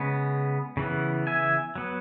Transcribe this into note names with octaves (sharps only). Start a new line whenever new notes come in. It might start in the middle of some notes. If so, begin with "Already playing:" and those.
Already playing: C#3 G#3 B3
C#3 E3 B3
E5 G#5
F#3 B3